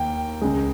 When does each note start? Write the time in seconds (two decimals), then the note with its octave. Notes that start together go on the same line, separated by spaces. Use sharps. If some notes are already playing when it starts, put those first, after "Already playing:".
Already playing: D#2 A#3 G5
0.41 C#2 C#3 G#3